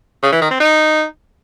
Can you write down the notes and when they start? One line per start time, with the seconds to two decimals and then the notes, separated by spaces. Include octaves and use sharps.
0.23 C#3
0.32 E3
0.42 D#3
0.51 C4
0.60 D#4